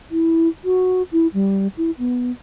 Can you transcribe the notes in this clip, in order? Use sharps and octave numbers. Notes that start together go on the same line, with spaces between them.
E4
F#4
E4
G3
E4
B3